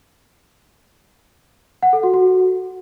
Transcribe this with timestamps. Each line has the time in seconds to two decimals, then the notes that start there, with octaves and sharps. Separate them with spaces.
1.83 F#5
1.93 A4
2.03 F#4
2.14 F#4